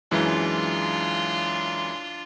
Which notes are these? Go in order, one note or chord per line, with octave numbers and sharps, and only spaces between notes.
F#2 E3 G#3 D4 F4